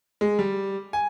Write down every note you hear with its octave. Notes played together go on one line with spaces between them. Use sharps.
G#3
G3
G#5